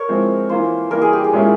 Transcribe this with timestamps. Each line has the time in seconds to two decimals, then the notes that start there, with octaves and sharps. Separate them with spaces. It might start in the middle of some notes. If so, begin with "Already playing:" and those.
Already playing: A#4 C#5
0.09 F3 G#3 C4 E4
0.49 E3 A#3 F4 C5
0.91 E3 G3 A#3 A#4
1.02 G#4
1.13 G4
1.24 G#4
1.33 A#2 G#3 C#4 E4